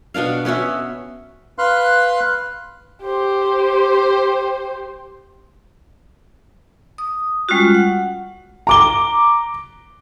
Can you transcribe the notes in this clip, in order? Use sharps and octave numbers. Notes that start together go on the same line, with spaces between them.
B2 B3 D4 F5
B3 C#4 F#4 E5
B4 F5 C6 F#6
G4 C5
D#6
G3 G#3 C#4 F4 F#4
F#5
A#5 D6 G7